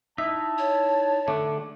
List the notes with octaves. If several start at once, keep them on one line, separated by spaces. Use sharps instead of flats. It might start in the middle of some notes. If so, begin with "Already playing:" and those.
D#4 E4 E5 A5
C#5
D3 A3 D4 D6